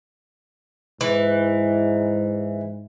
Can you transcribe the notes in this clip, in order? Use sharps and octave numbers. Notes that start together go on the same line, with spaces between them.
G#2 E3